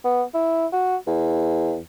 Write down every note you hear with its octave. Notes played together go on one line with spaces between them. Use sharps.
B3
E4
F#4
E2